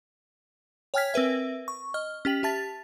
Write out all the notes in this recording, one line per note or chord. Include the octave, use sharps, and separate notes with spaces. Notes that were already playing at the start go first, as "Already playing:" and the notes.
C#5 G5 G#5 F6 G#6 B6
C4 A#4 B4 E5
C#6
D#5 F6
C#4 G4 G5 F#7
G4 E5 A5 A6